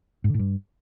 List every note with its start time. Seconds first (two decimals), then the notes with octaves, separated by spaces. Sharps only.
0.24 G#2
0.29 D3
0.34 A2
0.39 G2